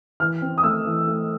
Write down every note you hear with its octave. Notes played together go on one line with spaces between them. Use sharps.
E3 F6
C4
D#6
A3 E6
E3
A3